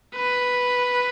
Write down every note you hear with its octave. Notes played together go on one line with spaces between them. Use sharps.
B4